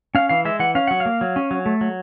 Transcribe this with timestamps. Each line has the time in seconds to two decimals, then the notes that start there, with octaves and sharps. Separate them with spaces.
0.15 C#4 F5
0.29 E3 F5
0.45 G#3 E5
0.59 E3 F#5
0.75 C#4 F5
0.87 F#3 F#5
1.00 F5
1.06 A#3
1.21 F#3
1.36 C#4
1.51 F#3
1.66 A3
1.81 F#3